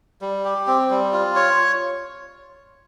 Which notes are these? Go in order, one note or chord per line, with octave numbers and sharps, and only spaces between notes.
G3
G4
C4
G3
F4
C#5